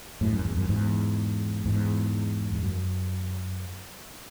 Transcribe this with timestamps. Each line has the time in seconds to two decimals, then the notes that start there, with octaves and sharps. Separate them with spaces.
0.21 F#2 A2
0.33 F#2
0.45 E2
0.57 F#2
0.69 E2 G#2
1.66 E2 G#2
2.52 E2
2.63 F#2